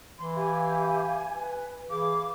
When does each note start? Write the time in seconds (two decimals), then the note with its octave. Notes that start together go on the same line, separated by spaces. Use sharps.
0.19 E3 C6
0.36 G4 E5 F5 G#5
1.34 B4
1.90 E3 G#4 F5 D6